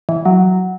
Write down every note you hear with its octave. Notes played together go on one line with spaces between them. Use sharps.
E3
F#3